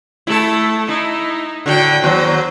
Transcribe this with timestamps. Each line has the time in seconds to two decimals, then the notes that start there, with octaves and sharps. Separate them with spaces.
0.27 A3 E4 A4
0.89 D#4 E4
1.66 A2 D3 F#4 G5
2.04 D#2 F#3 C5